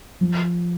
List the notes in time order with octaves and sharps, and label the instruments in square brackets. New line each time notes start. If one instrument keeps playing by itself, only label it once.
[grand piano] F3